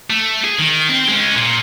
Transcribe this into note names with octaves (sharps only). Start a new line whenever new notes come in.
A3
G#4
D#3
C4
G#3 C#4
A#2